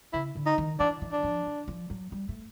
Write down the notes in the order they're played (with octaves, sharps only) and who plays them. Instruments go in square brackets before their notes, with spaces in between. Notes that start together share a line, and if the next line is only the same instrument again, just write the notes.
[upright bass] C#3 [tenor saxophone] E4
[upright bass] D3
[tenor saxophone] D#4
[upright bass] D#3
[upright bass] E3 [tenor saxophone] D4
[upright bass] E3
[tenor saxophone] D4
[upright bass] F3
E3
F3
F#3
G3
A3